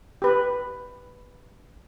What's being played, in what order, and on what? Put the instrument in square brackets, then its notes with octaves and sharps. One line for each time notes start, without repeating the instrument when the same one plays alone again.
[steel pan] G4 B4